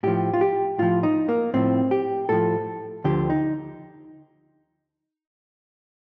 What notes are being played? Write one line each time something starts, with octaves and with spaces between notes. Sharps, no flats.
A2 F3 G4
F4
G4
A2 F3 F4
D#4
A#3
A2 F3 C4
G4
A2 F3 A4
D2 D3 F3 G4
D#4